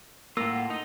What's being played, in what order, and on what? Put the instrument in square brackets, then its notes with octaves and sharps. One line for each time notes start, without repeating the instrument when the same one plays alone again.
[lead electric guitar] A2 F4 [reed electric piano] A#3 [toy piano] E6 [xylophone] A#6 F7 G7
[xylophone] F#5 G#5
[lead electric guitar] D#4 [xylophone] D#6 D#7